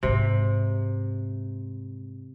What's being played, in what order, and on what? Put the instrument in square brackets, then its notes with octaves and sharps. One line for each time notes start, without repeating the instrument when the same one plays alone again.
[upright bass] G#2 G#3 [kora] C3